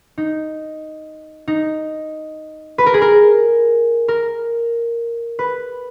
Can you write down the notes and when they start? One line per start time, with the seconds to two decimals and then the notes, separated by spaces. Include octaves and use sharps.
0.18 D#4
1.48 D#4
2.78 B4
2.86 A#4
2.94 G#4
3.02 A#4
4.08 A#4
5.39 B4